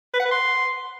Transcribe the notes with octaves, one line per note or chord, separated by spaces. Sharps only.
B4
F#5
B4
C6